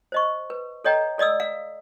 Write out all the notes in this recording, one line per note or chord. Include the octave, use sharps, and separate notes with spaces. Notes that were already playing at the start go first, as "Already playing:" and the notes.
C5 D#5 C#6
B4
A4 C#5 D#5 G5 A#5
A4 D5 D#5 D#6 E6
F5